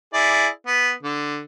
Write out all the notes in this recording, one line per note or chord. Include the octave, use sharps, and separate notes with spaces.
E4 G#4 D5
B3
D3